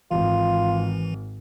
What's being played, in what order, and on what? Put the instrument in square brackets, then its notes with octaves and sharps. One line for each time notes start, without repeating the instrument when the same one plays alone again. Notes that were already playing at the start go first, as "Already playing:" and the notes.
[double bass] G#1 [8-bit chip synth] E3 [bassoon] F4